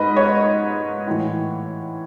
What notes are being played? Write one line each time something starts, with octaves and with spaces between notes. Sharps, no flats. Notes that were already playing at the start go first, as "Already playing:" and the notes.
Already playing: G#2 B4 D#5 B5
C#5
A2 E3